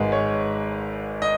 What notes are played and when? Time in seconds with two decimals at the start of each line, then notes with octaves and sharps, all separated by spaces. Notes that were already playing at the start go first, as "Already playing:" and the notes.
Already playing: G#1 G#2 G#3 B4
0.12 C#5
1.22 D#5